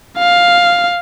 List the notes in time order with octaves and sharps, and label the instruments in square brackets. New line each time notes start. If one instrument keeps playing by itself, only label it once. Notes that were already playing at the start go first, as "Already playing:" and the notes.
[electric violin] F5